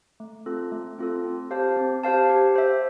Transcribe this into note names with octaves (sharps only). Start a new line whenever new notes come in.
A3
C4 F4 A4
A3
C4 F4 A4
C4
G4 C5 F5 A5
C4
G4 C5 F5 A5
G4
C5 E5